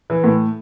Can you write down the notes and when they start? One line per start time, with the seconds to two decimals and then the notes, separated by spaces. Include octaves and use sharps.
0.10 E3
0.24 A2